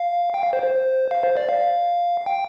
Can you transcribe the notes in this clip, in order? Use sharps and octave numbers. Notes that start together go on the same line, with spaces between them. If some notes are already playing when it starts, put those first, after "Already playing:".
Already playing: F5
G5
F5
C5
C5
F5
C5
D5
F5
G5